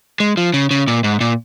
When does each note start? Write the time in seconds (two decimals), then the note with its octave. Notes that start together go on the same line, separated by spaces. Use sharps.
0.20 G#3
0.37 F3
0.54 C#3
0.71 C#3
0.88 A#2
1.04 G#2
1.20 A#2